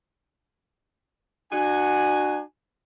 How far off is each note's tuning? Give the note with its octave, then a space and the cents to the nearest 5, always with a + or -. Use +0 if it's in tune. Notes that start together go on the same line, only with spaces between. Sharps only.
D4 +40 F#4 +0 G#5 +0